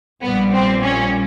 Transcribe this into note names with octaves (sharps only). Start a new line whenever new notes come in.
A#1 A#2 G3 B3
C4
C#4